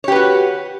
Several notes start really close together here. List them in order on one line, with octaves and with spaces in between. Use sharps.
C#5 G4 B4 F#4